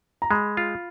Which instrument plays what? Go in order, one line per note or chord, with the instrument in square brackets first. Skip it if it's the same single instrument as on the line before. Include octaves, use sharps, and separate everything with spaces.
[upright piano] A#5
[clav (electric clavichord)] G#3 [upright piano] B5
[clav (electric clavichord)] F4